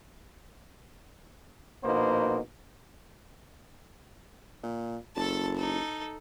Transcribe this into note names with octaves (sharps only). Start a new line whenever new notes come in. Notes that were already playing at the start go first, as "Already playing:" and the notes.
A#1 B2 A#3 B3 D#4 C5
A#2
F#1 A4 A5
D#4 A4